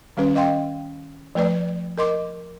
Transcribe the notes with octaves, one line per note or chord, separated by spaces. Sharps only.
D#3 G3 C#4 B4
D#5 F5 G5 C6
F3 A3 B4 D5
A#4 D#5 C6 D6